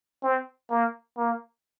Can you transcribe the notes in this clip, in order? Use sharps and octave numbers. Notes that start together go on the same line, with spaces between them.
C4
A#3
A#3